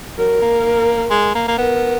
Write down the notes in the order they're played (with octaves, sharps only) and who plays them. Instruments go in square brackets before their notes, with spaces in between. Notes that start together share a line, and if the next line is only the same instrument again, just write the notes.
[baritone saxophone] F#3 [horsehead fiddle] A#4
[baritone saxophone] A#3
G#3
A#3
A#3
[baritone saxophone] B3 [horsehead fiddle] A#4